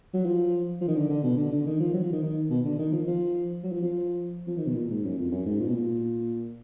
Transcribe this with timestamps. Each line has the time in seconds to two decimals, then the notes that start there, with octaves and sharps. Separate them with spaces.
0.14 F#3
0.26 F3
0.82 F3
0.88 D#3
0.96 D3
1.09 D3
1.24 B2
1.38 D3
1.52 D3
1.66 D#3
1.80 F3
1.94 F#3
2.04 F3
2.13 D#3
2.23 D#3
2.50 B2
2.65 D3
2.79 D#3
2.92 F3
3.07 F3
3.64 F#3
3.72 F3
3.83 F3
4.47 F3
4.57 D#3
4.67 B2
4.76 A#2
4.90 G#2
5.04 F#2
5.19 F2
5.32 F#2
5.46 G#2
5.60 A#2
5.67 B2
5.74 A#2